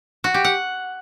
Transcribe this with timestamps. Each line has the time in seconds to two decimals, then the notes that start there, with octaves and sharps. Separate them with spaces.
0.24 F#4
0.34 G4
0.45 F#5